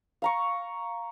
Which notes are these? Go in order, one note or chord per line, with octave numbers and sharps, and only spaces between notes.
F5 A#5 C#6